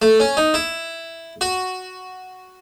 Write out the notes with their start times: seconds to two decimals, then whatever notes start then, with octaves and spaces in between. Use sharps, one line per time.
0.02 A3
0.20 C#4
0.37 D#4
0.54 E4
1.41 F#4